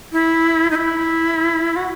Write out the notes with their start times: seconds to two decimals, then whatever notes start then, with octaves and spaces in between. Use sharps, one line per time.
0.12 E4
0.70 D#4
0.75 E4
1.76 F#4